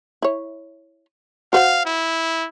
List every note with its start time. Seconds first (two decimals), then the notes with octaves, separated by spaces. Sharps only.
0.22 E4 C#5
1.53 F#4 C5 F5 F#5
1.86 E4